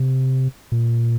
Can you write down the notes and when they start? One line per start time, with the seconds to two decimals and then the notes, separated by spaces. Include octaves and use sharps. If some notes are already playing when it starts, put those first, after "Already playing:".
Already playing: C3
0.72 A#2